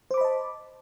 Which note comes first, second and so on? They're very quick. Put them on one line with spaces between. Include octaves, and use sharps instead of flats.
C5 D6 B5 D#5 A5